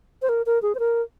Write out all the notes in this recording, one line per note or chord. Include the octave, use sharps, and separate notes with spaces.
C5
A#4
A#4
G#4
C5
A#4